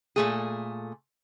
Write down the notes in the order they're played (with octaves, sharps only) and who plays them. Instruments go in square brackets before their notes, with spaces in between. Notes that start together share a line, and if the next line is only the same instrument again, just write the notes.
[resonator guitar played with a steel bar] A#2 A3 G#4